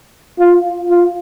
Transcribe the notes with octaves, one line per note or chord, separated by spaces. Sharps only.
F4
F4